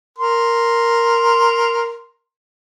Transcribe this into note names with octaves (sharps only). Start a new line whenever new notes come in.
A#4 C6